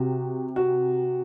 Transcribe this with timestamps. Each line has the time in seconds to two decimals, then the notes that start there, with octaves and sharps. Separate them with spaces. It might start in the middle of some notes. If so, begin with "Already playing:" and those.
Already playing: C3 F#4
0.56 F#4